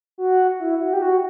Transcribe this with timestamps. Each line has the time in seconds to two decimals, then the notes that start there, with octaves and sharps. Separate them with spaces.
0.18 F#4
0.60 E4
0.81 F#4
0.93 G4
1.02 F#4